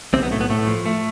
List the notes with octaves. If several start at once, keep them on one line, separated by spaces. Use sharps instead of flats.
B1 C3 C4
B3
A2 A3
B3
A2 A3
F3
A3